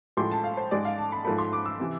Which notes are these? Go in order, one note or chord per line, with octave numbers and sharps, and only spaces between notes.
A2 F3 G#3 C6
A5
F5
C5
G#2 G#3 D5
F5
A5
B5
G#2 F3 A3 B5
C6
D6
E6
C3 E3